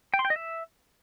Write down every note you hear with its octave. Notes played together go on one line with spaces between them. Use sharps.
G5
C6
G5
D#5
E5